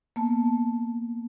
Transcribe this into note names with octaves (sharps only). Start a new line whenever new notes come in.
A#3 B3 A5